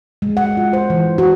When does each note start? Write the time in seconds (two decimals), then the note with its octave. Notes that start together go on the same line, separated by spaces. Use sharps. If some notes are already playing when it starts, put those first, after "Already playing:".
0.22 G#3
0.37 F#5
0.57 F4
0.73 C5
0.90 E3
1.18 F#4